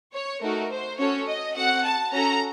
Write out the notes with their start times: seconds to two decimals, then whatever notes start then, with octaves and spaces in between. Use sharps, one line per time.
0.13 C#5
0.41 A3 D#4 F#4 A#4
0.71 C5
0.98 C#4 F#4 A4 C#5
1.27 D#5
1.55 C4 F#4 A4 F#5
1.84 A5
2.11 C#4 F#4 A4 A#5